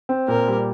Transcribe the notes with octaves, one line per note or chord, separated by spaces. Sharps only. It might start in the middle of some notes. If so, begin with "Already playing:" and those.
C4
A#2 A#4
G3